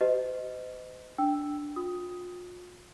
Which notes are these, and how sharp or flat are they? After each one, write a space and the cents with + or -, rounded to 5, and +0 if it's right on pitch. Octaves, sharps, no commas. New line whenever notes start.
G4 -40 C5 -45 D#5 +0
D4 +0 G5 +0 E6 +0
F4 +40 D#6 +10